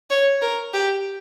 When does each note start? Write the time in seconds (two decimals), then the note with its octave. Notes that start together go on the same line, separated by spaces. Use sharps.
0.10 C#5
0.41 A#4
0.73 G4